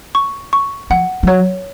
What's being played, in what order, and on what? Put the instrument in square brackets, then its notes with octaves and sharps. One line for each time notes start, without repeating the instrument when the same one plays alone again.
[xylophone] C#6
C#6
[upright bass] F3 [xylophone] F#5
[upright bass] F3
[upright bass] F#3 [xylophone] C#5